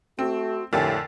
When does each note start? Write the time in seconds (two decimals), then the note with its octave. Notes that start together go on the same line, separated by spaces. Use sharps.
0.19 A3 C4 F#4
0.73 F2 A2 D3 G4 A#4 G5 G#5 A6